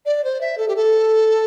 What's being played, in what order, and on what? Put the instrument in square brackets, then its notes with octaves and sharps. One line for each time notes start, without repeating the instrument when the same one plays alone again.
[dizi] D5
C5
E5
A4
G4
A4